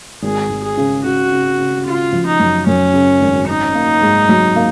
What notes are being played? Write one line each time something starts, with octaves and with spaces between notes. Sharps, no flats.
G#1 G#4
G#1
G#4
C#3
C#3 F#4
C#3
C#3
C#3 F4
F3
D#4
F#2
F#2 C#4
C#3
G#1
C#4 D#4
A#3
G#2
F#3
A#3